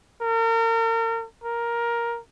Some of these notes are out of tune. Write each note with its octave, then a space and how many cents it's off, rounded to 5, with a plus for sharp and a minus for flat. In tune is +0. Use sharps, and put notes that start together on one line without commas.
A#4 -35
A#4 +10